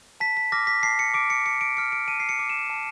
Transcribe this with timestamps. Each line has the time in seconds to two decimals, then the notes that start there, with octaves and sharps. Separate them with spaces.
0.20 A5 B6
0.37 B6
0.52 D6 F6 A#6
0.67 B6
0.83 A5 C7
0.99 C#7
1.14 D6 F6 D7
1.30 C#7
1.45 A5 C#7
1.61 D7
1.77 D6 F6 C#7
1.92 D7
2.08 A5 D#7
2.20 C7
2.29 C#7
2.39 D6 F6
2.50 E7
2.70 A5